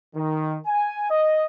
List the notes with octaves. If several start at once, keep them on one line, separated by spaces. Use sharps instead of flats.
D#3
G#5
D#5